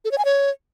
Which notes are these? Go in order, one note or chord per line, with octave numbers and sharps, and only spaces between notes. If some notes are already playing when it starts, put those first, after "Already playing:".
A4
C#5
G#5
C#5